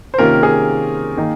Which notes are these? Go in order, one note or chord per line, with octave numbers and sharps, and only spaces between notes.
C5
C3 D#3 A#3 C#4 F4 A#4
G#4
D#3 A#3 D#4